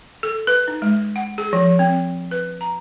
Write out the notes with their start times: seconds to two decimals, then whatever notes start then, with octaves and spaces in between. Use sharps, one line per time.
0.23 A4
0.47 B4
0.68 D#4
0.82 G#3
1.16 F#5
1.38 G#4
1.53 F3
1.79 C4
2.31 B4
2.61 A#5